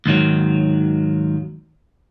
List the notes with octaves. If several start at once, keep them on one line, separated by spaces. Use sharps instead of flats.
D#2 G#2 D#3 F#3